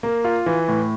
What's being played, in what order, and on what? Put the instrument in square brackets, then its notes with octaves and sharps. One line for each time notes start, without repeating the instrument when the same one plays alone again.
[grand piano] A#3
F4
E3
A2